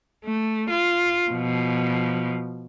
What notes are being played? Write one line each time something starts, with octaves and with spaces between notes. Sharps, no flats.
A3
F4
B2 F3